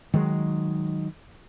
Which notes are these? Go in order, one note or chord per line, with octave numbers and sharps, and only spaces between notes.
D#3 F#3 G#3